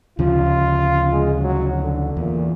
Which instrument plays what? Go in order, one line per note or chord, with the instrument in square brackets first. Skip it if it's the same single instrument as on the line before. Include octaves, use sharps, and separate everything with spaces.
[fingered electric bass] D2 C#3 F3 [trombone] F4
[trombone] G#3
F#3
D3
[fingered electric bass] E2 [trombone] A#2